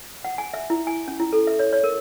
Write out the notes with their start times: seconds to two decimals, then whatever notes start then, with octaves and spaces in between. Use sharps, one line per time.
0.24 F#5
0.38 G#5
0.54 E5
0.70 E4
0.87 G#5
1.08 C#4
1.20 E4
1.33 A4
1.47 E5
1.59 C#5
1.73 C#5
1.84 A#4